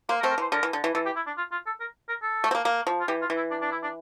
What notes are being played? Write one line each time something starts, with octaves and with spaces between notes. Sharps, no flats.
A#3 C5
A#4
A3 C4
A#4
E3 C5
D3 A#4
E3
D3
E3
E3 A4
G4
E4
D4
F4
F4
A4
A#4
A#4
A4
A3
C4
A#3
A#3
F3
F4
E3 G4
F4
E3
E4
D4
D4
E4
D4